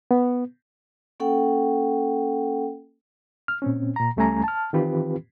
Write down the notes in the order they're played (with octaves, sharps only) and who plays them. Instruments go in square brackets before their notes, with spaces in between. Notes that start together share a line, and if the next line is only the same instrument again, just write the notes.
[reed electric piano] B3
[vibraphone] A#3 C#4 A4 F#5 G5
[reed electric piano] F6
A#2 C4 C#4
A#2 A#5
C#2 G3 A3 C#4 G#5 A#5
A5 F6
D#3 E3 C4 F4 G4 B4